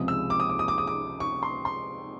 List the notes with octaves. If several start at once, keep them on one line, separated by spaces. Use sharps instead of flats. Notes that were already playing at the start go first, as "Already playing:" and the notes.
Already playing: C#2 C3 F3 G#3 D#6
E6
D6
D#6
D6
D#6
D6
D#6
D6
C#6
C6
C6